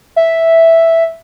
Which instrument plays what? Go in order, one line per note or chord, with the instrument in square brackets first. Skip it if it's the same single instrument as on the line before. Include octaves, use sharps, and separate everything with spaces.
[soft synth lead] E5